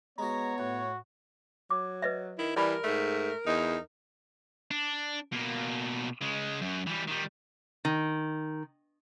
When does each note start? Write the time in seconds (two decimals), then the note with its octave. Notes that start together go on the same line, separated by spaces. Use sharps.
0.18 G#3 B3 F#4 C#5 A#5
0.58 A2 F#4
1.70 F#3 D6
2.02 B4 D#5 E5
2.38 D#3 E4
2.56 E3 G3 A#4 D5 A5 B5
2.84 G#2 A3
3.47 E2 D#4
4.71 D4
5.32 B2 A#3
6.21 C#3 G#3
6.61 F#2
6.87 E3 G3
7.07 D#3 G3
7.85 D#3